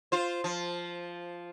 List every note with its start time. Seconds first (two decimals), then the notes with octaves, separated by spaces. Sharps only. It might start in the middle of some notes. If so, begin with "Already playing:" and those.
0.12 F4 C5
0.44 F3